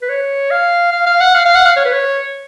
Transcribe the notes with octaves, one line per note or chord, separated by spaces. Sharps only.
B4
C#5
F5
F5
F5
F#5
F5
F5
F#5
F5
C#5
B4
C#5